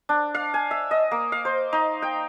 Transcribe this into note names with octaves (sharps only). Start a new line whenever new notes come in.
D4
F5
G#5
E5
D#5
A#3
F5
C5
D#4
G5